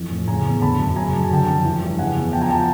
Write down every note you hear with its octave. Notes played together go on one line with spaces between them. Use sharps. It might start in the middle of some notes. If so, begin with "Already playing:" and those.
Already playing: F2 E3
A2
C#3 G#5 A#5
E2
D3 A5 B5
F#2
C#3 G#5 A#5
F#2 A5
G#5
D3 G5 A5
F2
E3
G2
C#3 F#5 G#5
E2
F3 G5 A5
G#5 A#5
G5 A5
F#5